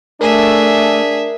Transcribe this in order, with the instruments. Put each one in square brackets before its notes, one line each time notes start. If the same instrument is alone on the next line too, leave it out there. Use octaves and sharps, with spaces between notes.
[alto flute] A3 [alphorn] D4 [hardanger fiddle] G#4 E5 [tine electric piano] A#4